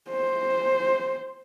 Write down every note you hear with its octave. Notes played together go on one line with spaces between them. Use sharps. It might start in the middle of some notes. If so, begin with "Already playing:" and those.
C5